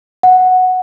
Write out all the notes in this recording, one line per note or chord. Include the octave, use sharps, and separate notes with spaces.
F#5